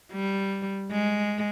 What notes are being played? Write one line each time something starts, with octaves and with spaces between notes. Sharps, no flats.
G3
G#3